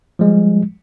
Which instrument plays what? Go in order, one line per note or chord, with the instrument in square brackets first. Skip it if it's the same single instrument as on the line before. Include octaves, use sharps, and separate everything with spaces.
[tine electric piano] F3 G3 G#3